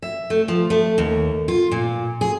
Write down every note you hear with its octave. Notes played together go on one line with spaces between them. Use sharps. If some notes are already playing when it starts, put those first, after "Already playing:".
E5
A3
F3
A3
D#2
F4
A#2
G#4